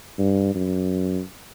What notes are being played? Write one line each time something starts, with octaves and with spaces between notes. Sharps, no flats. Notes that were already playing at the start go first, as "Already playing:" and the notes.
G2
F#2